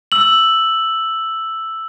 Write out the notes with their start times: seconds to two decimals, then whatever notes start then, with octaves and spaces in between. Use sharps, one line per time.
0.12 E6 F#7